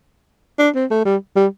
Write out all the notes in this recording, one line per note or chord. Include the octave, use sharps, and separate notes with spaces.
D4
C4
A3
G3
G3